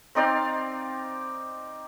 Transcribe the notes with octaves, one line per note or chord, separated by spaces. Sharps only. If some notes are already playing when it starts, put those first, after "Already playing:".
C4 D#4 D5 F5